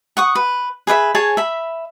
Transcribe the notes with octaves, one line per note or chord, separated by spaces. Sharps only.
F#5 C#6 D#6
B4
G#4 B4 D#5 E5
G#4 C#5 G#5 A5
E5 B5